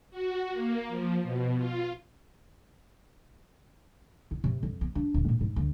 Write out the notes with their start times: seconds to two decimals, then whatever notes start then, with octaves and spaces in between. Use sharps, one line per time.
0.11 F#4
0.52 A#3
0.88 F3
1.23 B2
1.57 F4
4.31 E4
4.44 C3
4.63 F2
4.81 B3
4.95 D4
5.14 D1
5.29 A2
5.41 G#2
5.56 D2